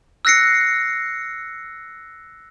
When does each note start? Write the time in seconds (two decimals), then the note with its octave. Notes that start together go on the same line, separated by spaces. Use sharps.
0.25 E6 F#6 A#6 C7 C#7